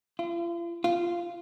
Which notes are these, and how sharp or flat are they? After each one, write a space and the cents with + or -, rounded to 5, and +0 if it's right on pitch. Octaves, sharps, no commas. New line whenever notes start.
F4 -40
F4 -10